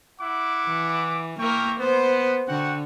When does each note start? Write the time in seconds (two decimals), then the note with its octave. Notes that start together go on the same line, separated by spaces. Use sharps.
0.21 E4 F#5 D6
0.67 E3
1.39 A#3 E4 A#4 G5 C#6
1.79 B3 C5
2.48 D3 F#4 F#5 G5